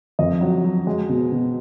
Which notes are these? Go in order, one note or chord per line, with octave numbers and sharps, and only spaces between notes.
F2 D#5
F#3
F#3
G#3
B2
B2